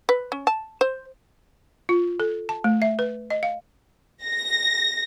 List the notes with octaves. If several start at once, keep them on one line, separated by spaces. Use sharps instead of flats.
B4
C#4
A5
C5
F4
A4
A5
A3
E5
B4
D#5
F5
A#6